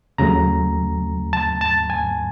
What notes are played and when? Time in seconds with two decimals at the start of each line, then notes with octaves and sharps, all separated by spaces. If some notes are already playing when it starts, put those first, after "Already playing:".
0.18 D#2 C#3 F#3 A3 A#5
1.33 A5
1.61 A5
1.90 G#5